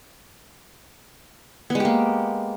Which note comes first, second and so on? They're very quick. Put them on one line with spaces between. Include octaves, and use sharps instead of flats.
B3 G#3 G4 A#3